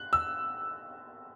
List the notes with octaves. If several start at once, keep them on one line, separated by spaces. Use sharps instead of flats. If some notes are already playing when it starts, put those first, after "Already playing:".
Already playing: F#6
E6